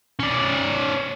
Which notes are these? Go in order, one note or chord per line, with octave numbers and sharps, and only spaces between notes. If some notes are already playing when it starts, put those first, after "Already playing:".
C#4 D5